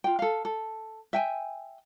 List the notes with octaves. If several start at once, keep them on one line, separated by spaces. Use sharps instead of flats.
F4 G5
A4 F5
A4
E5 G5 G#5